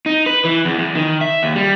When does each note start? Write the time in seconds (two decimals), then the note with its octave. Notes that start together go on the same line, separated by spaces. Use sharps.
0.06 D#4
0.26 B4
0.45 E3
0.65 E2
0.79 E2
0.95 D#3
1.21 E5
1.43 D#2
1.56 G3